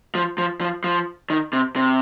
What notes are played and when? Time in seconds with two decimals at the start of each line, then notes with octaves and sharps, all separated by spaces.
0.15 F3
0.38 F3
0.61 F3
0.84 F3
1.30 D#3
1.53 C3
1.76 C3